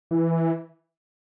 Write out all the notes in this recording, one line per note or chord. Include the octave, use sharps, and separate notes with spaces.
E3